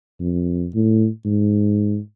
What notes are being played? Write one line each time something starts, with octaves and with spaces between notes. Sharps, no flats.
F2
A2
G#2